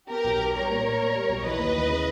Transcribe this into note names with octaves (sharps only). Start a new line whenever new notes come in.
B3 G4 A#4
B1
B3
G3 A#4 C#5
A#2
A#2
A#2
G3
B1
E3 B4 D#5
D#2
E3
C#3